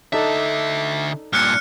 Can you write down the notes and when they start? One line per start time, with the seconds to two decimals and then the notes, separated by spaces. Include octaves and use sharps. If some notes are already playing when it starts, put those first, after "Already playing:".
0.13 D3 D4 D#4 A4 E5
1.33 G2 A#2 F6 F#6 C#7